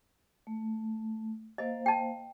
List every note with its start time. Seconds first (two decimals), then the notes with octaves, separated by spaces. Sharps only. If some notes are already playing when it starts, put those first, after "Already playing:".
0.47 A3
1.58 A#3 C5 D#5 F5
1.86 G5 A5